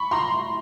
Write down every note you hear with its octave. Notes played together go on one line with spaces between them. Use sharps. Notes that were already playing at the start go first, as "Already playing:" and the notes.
Already playing: B5 C#6
A#5 C6